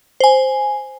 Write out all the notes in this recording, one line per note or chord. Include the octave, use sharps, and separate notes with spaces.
C5 G#5